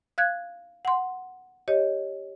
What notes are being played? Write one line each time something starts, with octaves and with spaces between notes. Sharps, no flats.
F5 F#6 G#6
F#5 C6
G4 C#5 D#5